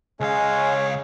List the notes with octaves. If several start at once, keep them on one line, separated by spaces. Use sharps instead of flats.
C#2 G#3 C#4 C#5 F5